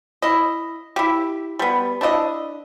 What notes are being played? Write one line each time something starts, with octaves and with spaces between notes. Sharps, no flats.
E4 D#5
E4 G4
G3 B3
D4 E4 F#4 D#5